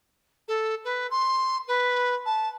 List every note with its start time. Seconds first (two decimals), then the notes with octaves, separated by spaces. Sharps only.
0.48 A4
0.84 B4
1.10 C6
1.68 B4
2.25 A5